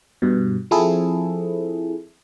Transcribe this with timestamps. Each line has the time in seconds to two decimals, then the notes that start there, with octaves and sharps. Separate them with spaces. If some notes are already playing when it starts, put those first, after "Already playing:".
0.22 G2 B2
0.71 F3 C4 E4 G#4 A4